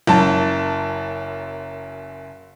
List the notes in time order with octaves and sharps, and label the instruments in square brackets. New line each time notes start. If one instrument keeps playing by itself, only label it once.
[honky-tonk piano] F#1 F#2 A5